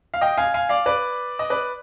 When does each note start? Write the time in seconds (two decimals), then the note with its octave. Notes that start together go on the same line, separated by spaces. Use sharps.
0.14 F5
0.21 D#5 G5
0.38 F5 G#5
0.54 F5 G#5
0.69 D5 F5
0.86 B4 D5
1.39 D#5
1.50 B4 D5